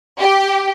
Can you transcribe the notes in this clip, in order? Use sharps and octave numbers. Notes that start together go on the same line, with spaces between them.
G4